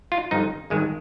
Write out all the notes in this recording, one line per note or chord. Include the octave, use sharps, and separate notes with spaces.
F4
G1 G2 F3 D#4
G#1 G2 D#3 G#3